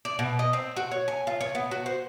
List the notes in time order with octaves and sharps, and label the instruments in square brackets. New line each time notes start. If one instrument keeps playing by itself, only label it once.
[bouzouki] D5
B2
D#5
C4
F#4
C#5
G#5
F4
C#5
B3
F#4
C5